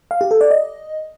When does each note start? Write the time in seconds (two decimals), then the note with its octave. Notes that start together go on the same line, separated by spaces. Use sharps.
0.11 F5
0.21 G4
0.31 A4
0.41 D5
0.51 D#5